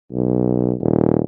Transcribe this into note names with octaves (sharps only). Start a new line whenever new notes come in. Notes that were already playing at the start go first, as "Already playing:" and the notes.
B1
D#1